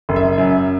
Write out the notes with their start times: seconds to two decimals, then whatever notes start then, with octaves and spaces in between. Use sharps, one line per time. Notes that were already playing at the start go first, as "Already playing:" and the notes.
0.09 F#1
0.16 E5
0.38 F#2